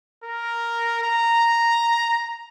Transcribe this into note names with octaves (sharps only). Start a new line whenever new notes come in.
A#4
A#5